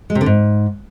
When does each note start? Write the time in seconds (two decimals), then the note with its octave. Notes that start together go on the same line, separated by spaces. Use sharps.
0.10 G#3
0.15 C3
0.21 D3
0.26 G#2